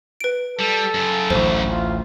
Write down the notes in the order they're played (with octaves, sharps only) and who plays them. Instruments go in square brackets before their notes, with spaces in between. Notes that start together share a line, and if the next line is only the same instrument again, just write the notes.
[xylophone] B4 D7
[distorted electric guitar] G3 [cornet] A4
[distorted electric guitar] F#2 C#3
[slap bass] A1 D2 [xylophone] C5
[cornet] F4